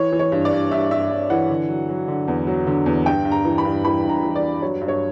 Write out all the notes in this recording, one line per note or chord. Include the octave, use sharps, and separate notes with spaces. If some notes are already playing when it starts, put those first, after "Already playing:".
Already playing: E3 C#5
E3
C#5
G2
D5
G2
G2 E5
G2 E5
G2
E3 F#5
D3
F#3
F#3
D3
E2
F#3
D3
E2
G2 G5
G2
A#5
E3
B5
G2
E3 B5
G2
A#5
E3
D5
G2
F#3 C#5
G2
C#5